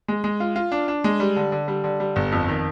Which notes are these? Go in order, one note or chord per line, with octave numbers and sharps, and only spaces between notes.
G#3
G#3
F4
F4
D4
D4
G#3
G3
D3
D3
G3
D3
G3
G1
F2
D#3